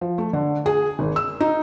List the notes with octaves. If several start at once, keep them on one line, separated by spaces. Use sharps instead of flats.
F3
A3
D3
G#4
G#1
E6
D#4